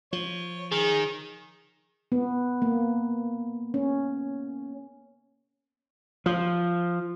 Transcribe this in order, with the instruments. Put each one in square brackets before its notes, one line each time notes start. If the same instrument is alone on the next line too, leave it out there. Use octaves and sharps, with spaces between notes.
[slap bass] F3 [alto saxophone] C#5
[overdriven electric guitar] D#3 [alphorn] G#4
[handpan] B3
A#3
C#4
[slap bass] F3